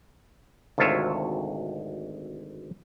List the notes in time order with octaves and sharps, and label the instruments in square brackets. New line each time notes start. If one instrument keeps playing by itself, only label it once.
[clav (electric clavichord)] G#1 D2 C3 F4 C#5 E5